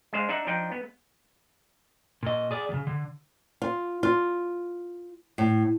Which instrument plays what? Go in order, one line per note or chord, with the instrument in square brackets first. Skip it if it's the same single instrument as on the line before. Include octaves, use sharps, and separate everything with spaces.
[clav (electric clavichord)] G#3 D4 C5 F5
D4 D#4 E5 F#5
F3 D4 D#4 G5
B3
[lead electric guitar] A#2 D#5
G#4 D5
D#2 C#3
D3
[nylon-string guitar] F4
F4
A2